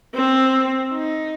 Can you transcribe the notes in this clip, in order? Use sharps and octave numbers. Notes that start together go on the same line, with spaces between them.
C4
D#4